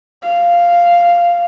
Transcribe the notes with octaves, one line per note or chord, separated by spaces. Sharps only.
F5